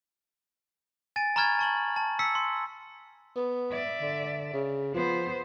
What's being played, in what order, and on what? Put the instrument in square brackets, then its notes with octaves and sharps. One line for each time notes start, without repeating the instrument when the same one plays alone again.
[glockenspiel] G#5 A6 D7 D#7
A#5 B5 C#6 F6 G#6 A6
A5 C#6 F#7
A5
E6 B6 C#7
C6
[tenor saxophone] B3
[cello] D5 E5
[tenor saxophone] D3
C#3
[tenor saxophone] F3 [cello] B3 C5